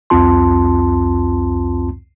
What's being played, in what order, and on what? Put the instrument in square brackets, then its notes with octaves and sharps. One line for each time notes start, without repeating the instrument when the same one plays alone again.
[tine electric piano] C2 F2 C4 F4 A5 C6